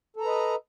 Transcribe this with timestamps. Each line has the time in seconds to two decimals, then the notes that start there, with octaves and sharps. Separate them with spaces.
0.16 A4
0.20 A#5
0.24 B4
0.28 D#5